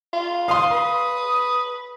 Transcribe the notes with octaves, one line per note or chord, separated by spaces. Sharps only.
F4
F5 C6 D#6
B4 D#6